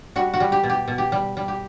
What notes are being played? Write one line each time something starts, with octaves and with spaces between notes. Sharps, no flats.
G3 F#4
F#4
G3
G4
B2
G4
B2
G4
G3
G3
G4